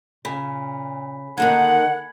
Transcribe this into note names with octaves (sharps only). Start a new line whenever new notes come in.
A#2 C#3 G#5 B5 B6
D3 D#3 A#3 D#4 F#5 G#6